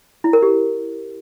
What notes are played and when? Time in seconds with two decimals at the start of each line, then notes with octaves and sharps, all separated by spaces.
0.24 E4
0.33 A#4
0.42 G4